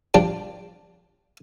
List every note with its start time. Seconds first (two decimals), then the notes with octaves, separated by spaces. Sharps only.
0.14 F3 D4 G4 D5